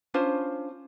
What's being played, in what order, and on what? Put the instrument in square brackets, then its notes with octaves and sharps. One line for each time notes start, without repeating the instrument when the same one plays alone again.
[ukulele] C#4 D4 F4 C5